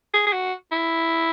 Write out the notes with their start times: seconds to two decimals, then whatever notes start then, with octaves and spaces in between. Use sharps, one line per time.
0.14 G#4
0.27 G#4
0.33 F#4
0.72 E4